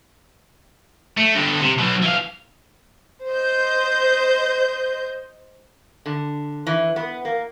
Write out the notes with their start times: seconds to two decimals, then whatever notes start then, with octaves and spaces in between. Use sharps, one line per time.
1.17 A3
1.35 G2 D3
1.60 C3
1.78 B2 F#3
2.02 E3 F5
3.27 C5 D#5 G6
6.06 D3
6.67 E3
6.96 B3
7.25 A#3